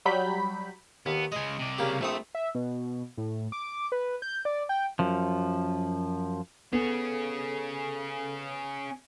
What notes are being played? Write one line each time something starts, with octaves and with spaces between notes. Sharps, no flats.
F#3 G3 B5 G6 B6
D#2 B3
C#3 G#3 D#5 G#5
C3 D5
C#3 A#3 G4
A#1 A3 C4 E5 D#6
E5
B2
A2
D6
B4
G6
D5
G5
F#2 F3
B3 C#4 G#4 A4